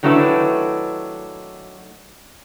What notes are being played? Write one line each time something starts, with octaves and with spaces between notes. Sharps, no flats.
D#3 F#3 A3 D4 E4 B4